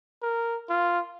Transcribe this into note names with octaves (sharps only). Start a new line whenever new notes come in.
A#4
F4